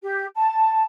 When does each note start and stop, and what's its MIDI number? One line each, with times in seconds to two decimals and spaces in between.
0.02 0.26 67
0.35 0.83 81